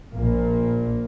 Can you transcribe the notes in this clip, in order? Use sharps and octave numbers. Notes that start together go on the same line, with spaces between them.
A#1 A#2 A#3